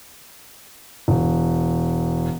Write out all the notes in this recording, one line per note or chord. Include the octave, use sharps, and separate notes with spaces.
E1